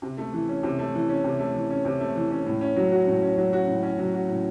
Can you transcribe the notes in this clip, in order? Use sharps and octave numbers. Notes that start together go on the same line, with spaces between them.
C3
A3
E3
C#4
C3
A3
E3
C#4
C3
A3
E3
C#4
C3
A3
E3
C#4
A2
C#4
F#3
F#4
A2
C#4
F#3
F#4
A2
C#4
F#3
F#4
A2